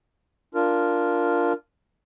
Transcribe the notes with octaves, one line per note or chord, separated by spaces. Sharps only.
D4 F4 A#4